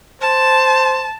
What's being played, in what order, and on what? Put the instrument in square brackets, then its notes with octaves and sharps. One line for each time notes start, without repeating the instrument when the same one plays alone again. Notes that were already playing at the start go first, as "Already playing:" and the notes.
[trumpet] C5 [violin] A5